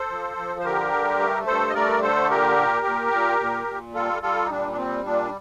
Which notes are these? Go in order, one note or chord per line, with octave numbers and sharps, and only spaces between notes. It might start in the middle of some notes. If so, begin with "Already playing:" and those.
Already playing: A4 C5
F3
F3
C5
D3 G4 A#4
G2
A3
G2 A4 C5
D#5
A3 A#4 D5
D3 A4 C5
A#2 G4 A#4
A#2
A#2
A#2
A#2
A#2
G3 F4 A4
G3 F4 A4
D#4
A#2 D4
D4
G3 C4
A#2 D4